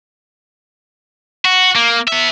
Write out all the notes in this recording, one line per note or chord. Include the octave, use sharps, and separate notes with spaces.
F#4
A#3
B3 E5